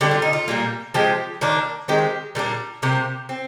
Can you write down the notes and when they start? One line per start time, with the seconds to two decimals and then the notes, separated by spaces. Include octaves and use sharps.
0.01 D3 G3 D4 G4
0.11 F4
0.22 D#4
0.33 F4
0.48 A#2 G3 A#3
0.94 F3 G#3 C4 G4
1.41 D#3 A#3 D4
1.88 D#3 G#3 C4 G4
2.35 A#2 G3 A#3 D4
2.82 C3 G3 A#3 G4
3.29 C4